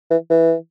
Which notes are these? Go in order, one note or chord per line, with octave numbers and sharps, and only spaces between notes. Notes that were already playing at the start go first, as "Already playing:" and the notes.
E3
E3